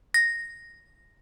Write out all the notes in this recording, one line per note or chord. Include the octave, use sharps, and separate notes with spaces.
A#6